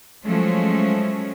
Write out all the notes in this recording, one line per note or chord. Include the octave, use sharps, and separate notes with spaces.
F3 F#3 G#3 A3 C#4